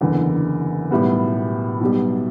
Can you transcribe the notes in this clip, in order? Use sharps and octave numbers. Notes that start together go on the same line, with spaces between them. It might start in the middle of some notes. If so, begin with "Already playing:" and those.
F#1 E2 D3
B1 A2 G3 B3
B1 B2 G3